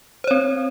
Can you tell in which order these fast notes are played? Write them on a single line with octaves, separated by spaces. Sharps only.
C5 C#5 C4